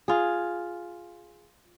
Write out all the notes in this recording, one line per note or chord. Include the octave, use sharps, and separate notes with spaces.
F4 G#4